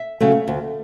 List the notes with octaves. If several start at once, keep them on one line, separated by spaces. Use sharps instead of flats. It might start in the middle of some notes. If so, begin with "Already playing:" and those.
Already playing: E5
C#3 F#3 A3
D2